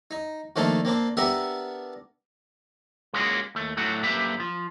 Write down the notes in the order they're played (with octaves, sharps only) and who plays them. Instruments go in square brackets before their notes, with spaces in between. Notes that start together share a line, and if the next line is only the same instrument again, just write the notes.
[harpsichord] D#4
D#3 F3 A3 A#3 D4 A4
A#3 C4 D4
B3 D4 G4 A#4 E5 F#5
[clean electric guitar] G#3 A#3 C#4 D#4 F#4 G#4
D#2 A3
A2 F#3 A3 D4 F#4
F#2 D3 A#3 G4 B4 E5
F3